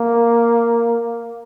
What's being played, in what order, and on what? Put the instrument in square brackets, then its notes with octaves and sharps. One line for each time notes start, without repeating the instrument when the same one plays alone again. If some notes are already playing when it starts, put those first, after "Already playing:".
Already playing: [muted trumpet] A#3